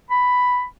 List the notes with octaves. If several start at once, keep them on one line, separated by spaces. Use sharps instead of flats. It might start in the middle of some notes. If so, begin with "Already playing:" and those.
B5